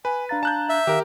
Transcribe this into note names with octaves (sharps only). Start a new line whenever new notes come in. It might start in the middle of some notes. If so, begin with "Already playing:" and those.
B4 G#5
D4 F5 A#5 A6
A5 F#6 G6
E5
D#3 G4 A#4 F5